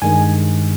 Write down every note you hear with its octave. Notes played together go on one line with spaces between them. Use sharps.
G2 D#3 G#3 G#5